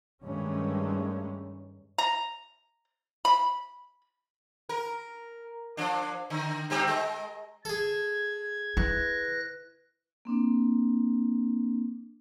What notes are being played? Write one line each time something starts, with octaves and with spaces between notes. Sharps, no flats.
G2 D#3 G#3 A3 C#4
A#5
B5
A#4
F3 D4
D3
G2 C4 G4
G#3
G#4 A4 G#6
E4 B4 F#6 A#6
A#3 C4 D4